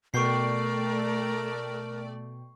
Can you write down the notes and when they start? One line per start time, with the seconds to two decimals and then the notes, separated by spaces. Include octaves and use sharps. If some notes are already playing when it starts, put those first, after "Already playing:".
0.14 B2 A3 A#4 D5 G5 C#6 C7